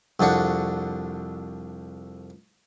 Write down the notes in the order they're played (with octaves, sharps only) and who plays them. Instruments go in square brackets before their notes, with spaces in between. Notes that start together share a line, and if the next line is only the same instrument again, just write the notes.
[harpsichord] C2 F2 D4 F#4 C#6